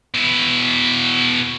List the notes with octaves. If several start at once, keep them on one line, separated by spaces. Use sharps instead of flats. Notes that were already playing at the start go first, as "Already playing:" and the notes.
B2 E4